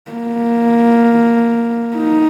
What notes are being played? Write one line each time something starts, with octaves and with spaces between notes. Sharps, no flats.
A#3
D#4